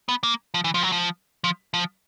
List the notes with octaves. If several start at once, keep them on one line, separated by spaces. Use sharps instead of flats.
B3
A#3
F3
E3
F3
F#3
F3
F3
F3